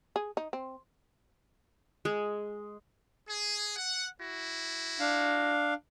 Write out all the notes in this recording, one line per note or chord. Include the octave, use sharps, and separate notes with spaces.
G#4
D#4
C4
G#3
G#4
F#5
E4 F#4
D4 F5